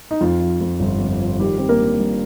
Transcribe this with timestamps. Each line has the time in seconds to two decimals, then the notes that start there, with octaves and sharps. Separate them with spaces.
0.11 D#4
0.21 F2 F4
0.41 F3
0.61 F2
0.80 G1
0.99 F2
1.19 F3
1.39 D#3 G3 G4
1.58 C4 G4
1.69 A#3 A#4
1.79 G2
1.99 G2